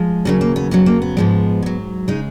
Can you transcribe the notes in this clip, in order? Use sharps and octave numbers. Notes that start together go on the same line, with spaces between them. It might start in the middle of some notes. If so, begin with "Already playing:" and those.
Already playing: F3 G#3
D#2 C#3 F#3 C#4
A#3
B3
F2 C#3 F#3 B3
A#3
B3
G#2 F3 G#3
G#2 F#3
C#3 G#3 D#4